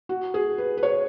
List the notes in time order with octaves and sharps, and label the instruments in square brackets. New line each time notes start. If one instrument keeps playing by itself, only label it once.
[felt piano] F#4
G#4
B4
B4
C#5